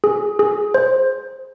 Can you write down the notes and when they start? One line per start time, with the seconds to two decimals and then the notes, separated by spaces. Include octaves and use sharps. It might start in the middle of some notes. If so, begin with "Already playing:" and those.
0.04 G#4
0.39 G#4
0.74 C5